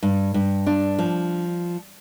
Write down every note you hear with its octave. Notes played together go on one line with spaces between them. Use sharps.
G2
G2
D4
F3